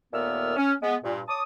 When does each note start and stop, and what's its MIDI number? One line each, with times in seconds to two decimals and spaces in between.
0.13 0.55 39
0.13 0.55 46
0.13 0.55 57
0.13 0.55 59
0.13 0.55 88
0.13 0.55 89
0.57 0.73 61
0.83 0.96 56
0.83 0.96 59
1.04 1.21 43
1.04 1.21 46
1.28 1.42 73
1.28 1.42 81
1.28 1.42 86
1.28 1.42 87